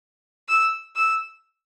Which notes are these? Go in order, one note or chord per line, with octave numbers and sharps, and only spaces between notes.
E6
E6